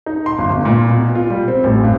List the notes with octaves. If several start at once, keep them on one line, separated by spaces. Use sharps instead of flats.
D#4
C6
G1
G1
A#2
B2
F4
G3
C4
A1
G2